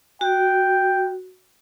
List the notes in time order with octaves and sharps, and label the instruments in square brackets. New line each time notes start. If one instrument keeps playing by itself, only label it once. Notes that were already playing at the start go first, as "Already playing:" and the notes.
[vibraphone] F#4 [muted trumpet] G5